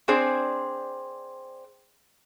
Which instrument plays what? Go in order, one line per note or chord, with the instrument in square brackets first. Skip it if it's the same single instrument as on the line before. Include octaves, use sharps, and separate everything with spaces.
[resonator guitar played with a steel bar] C4 D4 G#4 C5 D5